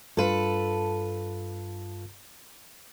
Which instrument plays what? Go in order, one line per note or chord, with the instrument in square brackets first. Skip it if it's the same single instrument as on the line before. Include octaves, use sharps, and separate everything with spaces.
[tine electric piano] G2 F4 F5 [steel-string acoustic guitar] A4 B4